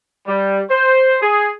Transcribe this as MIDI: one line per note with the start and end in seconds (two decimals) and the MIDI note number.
0.27 0.61 55
0.71 1.16 72
1.22 1.51 68